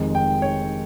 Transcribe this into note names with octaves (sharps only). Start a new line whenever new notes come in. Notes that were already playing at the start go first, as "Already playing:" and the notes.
Already playing: F1 F2 D#3 G#3
G5
C#5